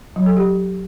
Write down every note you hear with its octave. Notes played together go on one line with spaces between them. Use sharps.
F#3
A4
G4